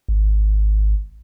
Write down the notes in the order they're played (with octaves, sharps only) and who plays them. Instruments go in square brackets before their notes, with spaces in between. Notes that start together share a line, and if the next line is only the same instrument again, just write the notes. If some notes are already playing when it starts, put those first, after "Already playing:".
[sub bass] G#1